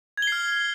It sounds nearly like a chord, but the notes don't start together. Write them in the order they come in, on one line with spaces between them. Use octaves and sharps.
G#6 G7 C7 F6